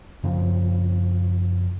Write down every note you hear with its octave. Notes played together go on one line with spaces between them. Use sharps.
F#2 C#3 F3 C4